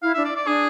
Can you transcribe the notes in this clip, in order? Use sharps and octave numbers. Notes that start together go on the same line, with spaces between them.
E4 F5
E5
D4
D5
D5
D4 G#4